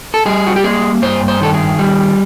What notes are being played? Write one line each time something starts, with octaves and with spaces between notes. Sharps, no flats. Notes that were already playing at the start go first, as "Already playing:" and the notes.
A4
G3 G#4
F#4
G4
A#3 G#4
G2 C5
C5
D#3 A4
G#4
G3